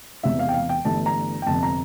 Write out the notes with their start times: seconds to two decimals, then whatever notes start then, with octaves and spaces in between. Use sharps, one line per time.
0.23 E1 E2 C3 E5
0.39 F5
0.49 G5
0.54 F5
0.69 G5
0.85 G1 G2 E3 A3 A5
1.06 A#5
1.42 G5
1.47 G1 F2 C3 A5
1.63 A#5